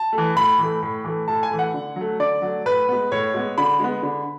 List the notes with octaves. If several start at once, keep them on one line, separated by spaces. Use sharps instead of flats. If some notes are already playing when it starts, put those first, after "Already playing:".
Already playing: A5
A3
E3
A2 B5
E3 A3
A2
E3 A3
A2 A5
G#5
E3 A3
F#5
D3
F#3 A3
D3 D5
F#3 A3
A2 B4
G#3 B3
A2 C#5
G#3 B3
D3 B5
G#3 B3
D3